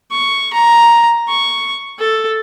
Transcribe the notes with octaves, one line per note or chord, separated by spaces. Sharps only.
C#6
A#5
C#6
A4